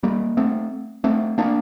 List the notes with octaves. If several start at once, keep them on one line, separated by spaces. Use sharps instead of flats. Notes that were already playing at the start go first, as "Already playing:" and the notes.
G3 A#3
A3 C4
A3 C4
A#3 D4